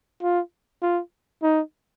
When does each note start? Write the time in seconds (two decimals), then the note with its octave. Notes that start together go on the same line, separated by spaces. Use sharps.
0.22 F4
0.82 F4
1.43 D#4